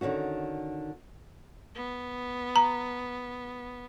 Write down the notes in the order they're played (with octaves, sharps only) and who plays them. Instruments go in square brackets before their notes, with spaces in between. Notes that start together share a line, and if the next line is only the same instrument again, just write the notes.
[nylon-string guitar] D3 D#3 C#4 F#4
[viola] B3
[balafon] A#5